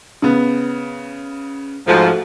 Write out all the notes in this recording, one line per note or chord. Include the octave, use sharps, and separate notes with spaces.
C#3 B3
G#2 F3 A3 F#4